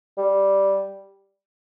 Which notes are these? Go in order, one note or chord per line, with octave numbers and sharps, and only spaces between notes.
G3